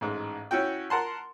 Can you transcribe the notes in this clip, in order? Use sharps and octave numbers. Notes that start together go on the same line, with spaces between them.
A1 G#2
C#4 E4 F#4 G5
A#4 F#5 A5 C6